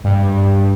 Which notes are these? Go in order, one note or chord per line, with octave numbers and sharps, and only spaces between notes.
G2